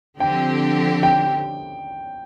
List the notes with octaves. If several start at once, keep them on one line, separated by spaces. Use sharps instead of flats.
D3 F3 C4 G4 G5
G5